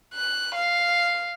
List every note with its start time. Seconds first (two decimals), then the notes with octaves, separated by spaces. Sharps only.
0.14 F#6
0.55 F5